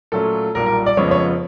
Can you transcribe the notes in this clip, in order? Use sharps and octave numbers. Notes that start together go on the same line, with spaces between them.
A#2 F#3 A3 C#4 F4 A4
B1 A#2 G3 A#4
A#4
D5
F2 C#3 F3 G#3 B3 C#5
C#5